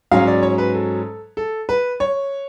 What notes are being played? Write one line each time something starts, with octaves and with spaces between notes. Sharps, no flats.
G#2 F#3 C#4 F5
D5
C#5
B4
A4
A4
B4
C#5